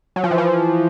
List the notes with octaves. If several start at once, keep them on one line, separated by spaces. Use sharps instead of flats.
F#3
F3
E3
F3